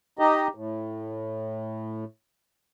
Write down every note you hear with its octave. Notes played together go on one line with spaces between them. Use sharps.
D#4 G4 D#5
A2